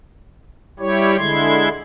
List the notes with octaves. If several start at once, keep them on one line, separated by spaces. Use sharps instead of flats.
G3 E4 G4 C#5
D3 G#3 E4 C6 G#6